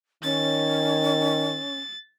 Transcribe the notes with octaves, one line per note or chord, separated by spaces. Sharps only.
D#3 C#4 A6